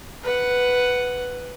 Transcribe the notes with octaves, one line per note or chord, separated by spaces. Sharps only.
B4 F#5